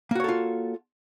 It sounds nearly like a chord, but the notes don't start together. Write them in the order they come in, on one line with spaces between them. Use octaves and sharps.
A#3 F#4 C#5 A4 F4